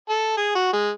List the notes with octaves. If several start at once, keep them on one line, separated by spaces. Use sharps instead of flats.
A4
G#4
F#4
G#3